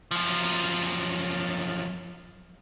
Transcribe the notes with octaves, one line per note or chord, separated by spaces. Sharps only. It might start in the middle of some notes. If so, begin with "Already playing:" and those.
F#2 F3